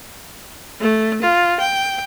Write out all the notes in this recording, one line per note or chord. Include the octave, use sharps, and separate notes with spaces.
A3
F4
G5